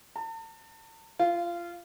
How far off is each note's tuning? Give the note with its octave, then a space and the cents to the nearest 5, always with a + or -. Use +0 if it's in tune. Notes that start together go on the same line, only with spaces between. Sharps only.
A5 +40
F4 -20